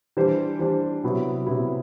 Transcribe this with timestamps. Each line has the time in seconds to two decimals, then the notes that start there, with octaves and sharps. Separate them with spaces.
0.17 E3 G3 D4 G4 C5
0.59 E3 G3 D4 G4 C5
1.04 C3 F#3 B3 E4
1.46 C3 F#3 B3 E4